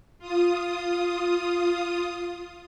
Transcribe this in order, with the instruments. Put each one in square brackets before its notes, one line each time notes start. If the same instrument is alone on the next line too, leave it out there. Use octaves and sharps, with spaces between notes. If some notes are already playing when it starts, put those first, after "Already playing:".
[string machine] F4 D#6